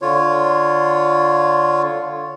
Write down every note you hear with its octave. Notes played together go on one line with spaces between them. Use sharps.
D3 F4 C#5